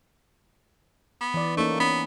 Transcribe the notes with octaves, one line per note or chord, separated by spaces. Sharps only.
B3
E3 D5
A3 A#3 C#4 D#4
B3 C#4